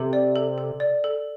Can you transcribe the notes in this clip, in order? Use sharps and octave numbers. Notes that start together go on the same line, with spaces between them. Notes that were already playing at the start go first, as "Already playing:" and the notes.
Already playing: C3 A4
D5
A4
A4
D5
A4